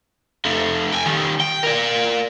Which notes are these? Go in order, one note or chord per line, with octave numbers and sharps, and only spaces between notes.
F2 A3
G5 G#5
D#3 G3
G5
A#4 D5